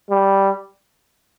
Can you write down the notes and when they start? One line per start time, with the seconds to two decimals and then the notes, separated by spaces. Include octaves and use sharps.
0.10 G3